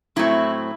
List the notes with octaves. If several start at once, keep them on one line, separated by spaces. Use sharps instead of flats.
A2 F#3 A3 C4 E4